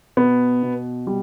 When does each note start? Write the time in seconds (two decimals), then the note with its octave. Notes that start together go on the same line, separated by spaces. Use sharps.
0.17 B2 B3
0.63 B2
1.07 G3